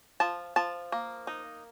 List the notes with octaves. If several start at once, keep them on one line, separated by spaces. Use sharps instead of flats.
F3 A5
F3 A5
A#3
D#4